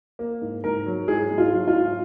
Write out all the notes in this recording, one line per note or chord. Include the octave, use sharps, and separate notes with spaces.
A#3
G#2
G#2 A#4
F#3
G#2 G#4
G#2
F4
F#3
F4
G#2